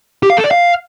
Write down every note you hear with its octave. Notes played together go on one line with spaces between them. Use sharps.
G4
F5
A4
D5
F5